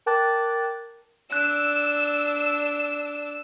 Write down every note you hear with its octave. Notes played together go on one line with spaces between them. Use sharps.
A#4 G5 A5 D6 F#6 A6
D4 E6 F#6